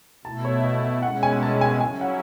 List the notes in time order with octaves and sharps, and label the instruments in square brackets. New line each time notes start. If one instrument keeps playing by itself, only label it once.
[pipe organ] B2 A3 E4 [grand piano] A5
[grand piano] C#5
E5
D#5
E5
[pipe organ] B2 G#3 C#4 E4 [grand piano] F#5
[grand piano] G#5
A5
G#5
[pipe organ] C#3 F#3 C#4 E4 [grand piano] G#5
[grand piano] F#5